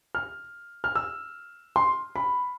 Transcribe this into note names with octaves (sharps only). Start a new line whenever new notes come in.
F6
F6
E6
C6
B5